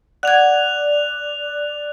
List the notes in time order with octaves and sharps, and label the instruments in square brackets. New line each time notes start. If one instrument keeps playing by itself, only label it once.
[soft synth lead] D5 [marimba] F#5 G#6 [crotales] F#6 F7